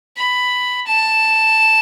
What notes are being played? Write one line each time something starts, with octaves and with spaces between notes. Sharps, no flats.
B5
A5